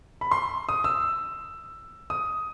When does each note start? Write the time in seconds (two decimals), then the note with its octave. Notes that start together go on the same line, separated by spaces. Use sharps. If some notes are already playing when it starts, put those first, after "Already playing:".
0.21 B5
0.31 C6
0.69 D#6
0.84 E6
2.10 D#6